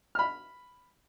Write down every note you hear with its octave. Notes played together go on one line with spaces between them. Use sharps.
B5 F6